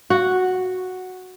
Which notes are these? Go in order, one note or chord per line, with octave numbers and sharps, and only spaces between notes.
F#4